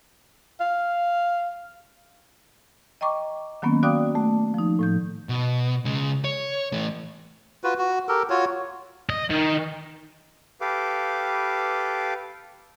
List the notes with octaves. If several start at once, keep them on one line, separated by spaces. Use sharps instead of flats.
F5
D#5 G5 A#5 C#6 D6
D#3 F#3 A#3 B3 C#4
F#4 D5 F5 G5 D6 D#6
A3
F3 D#4
A2 F3 G6
B2
C#3 G#3
C#5
E3 A3
F4 F#4 B4
F#4
G4 A4 A#4
F4 F#4 C#5
D#5
D#3
G4 A4 B4 F5 D6